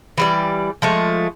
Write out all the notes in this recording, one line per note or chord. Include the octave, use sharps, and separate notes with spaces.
E3 G3 D5
F3 G#3 A3